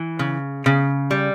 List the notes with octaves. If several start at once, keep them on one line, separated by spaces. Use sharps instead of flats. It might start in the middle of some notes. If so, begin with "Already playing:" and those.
Already playing: E3
C#3
C#3
G3